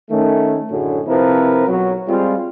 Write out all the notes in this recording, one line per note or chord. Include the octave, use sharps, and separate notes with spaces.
D#3 A3 C#4
F#2 A2 D3 F#3 G#3
C3 F3 C4 E4 A#4 B4
B1 F#3
G3 G#3 C4 F4